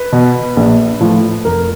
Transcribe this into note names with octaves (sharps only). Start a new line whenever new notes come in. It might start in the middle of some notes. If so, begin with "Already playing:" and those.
Already playing: B4
B2
A#1
A2 F3
F1 A#4